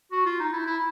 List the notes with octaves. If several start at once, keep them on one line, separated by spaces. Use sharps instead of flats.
F#4
F4
D#4
E4
E4